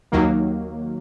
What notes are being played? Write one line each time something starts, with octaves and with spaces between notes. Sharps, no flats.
D#2 D#3 F#3 A#3